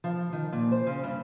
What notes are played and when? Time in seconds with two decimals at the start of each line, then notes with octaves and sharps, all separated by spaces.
0.04 F3
0.33 D#3
0.52 A#2
0.72 C5
0.86 C#3
1.03 G2